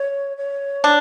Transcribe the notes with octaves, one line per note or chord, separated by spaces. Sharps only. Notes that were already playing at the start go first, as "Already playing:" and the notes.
Already playing: C#5
C#5
D4